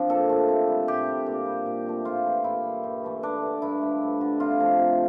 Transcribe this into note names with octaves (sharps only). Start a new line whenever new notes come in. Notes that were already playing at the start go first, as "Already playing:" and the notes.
Already playing: F3 C4 D4
A#2 A4
F3 A3
C3
G3
A2 G4
G3
A#2
G3
A#2
F3 A3
A2 F4
E3 A3
A#2 E4
G3
G2
E3 A3
G2 D4
D3 A3
G2 E4
F3 A3
G2
D3 G3
C3 F4
F3 A3
C3